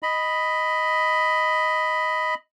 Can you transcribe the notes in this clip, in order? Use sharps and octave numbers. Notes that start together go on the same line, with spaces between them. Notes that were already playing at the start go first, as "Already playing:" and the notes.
D#5 B5